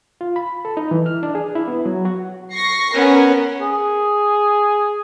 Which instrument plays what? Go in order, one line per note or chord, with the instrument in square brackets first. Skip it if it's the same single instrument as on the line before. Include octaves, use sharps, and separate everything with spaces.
[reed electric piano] F4
B5
A4
D#4
E3
F6
D4
G#4
E4
B3
F#3
F#4
[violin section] C#6 A#6 C7
[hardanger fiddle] B3 C#4 [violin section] A#4
[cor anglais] G#4